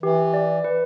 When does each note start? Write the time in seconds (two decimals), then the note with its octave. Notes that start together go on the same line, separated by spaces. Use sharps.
0.03 E3 G4
0.34 D5
0.64 B4